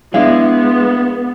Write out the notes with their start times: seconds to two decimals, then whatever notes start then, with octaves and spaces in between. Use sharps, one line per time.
0.14 G#3 B3 D4 E4 F5